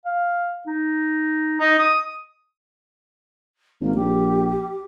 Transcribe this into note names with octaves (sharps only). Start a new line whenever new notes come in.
F5
D#4
D#4 D#5
D#6
G#1 A#3
A#1 G4